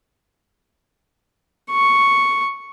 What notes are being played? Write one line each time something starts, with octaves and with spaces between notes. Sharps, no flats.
C#6